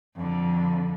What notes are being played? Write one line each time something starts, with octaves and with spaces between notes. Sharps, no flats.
F2 D3